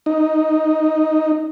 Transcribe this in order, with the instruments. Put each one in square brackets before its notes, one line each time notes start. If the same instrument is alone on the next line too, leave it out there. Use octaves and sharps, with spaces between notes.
[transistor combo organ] D#4